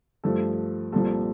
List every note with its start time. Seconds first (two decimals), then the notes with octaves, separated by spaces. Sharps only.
0.24 G2 F3 A3 A4
0.92 C2 A#2 F3 A4